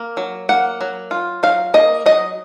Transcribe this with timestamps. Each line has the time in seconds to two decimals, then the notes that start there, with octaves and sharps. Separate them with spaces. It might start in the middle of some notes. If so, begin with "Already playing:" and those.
Already playing: A#3
0.17 F#3
0.49 A#3 F#5
0.81 F#3
1.11 F4
1.43 F#3 F5
1.74 A#3 D#5
2.06 F#3 D#5